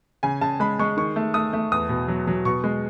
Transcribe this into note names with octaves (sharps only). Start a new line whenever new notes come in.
C#3 G#5
C#3 A5
G#3 B5
G#3 C#6
D#3 C#6
A3
A3 D#6
A3
E2 D#6
B2
F#3
F#3
B2 C#6
G#3